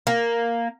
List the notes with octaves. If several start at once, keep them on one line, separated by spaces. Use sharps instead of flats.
A#3